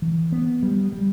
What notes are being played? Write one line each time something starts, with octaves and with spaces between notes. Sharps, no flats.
E3
B3
G3
G3